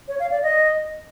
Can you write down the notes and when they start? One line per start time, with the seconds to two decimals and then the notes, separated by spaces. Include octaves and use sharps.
0.08 C#5
0.20 F5
0.31 D5
0.43 D#5